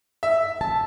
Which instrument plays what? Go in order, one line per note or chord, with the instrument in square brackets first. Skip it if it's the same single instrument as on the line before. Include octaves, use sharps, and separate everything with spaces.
[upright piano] E5
[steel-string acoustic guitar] A5